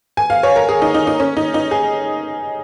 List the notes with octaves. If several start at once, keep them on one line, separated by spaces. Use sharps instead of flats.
G#5
F5
C#5
A#4
G#4
D#4
D#4
D#4
C#4
D#4
D#4
G#4